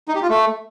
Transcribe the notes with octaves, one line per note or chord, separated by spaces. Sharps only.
D#4
G4
F4
A3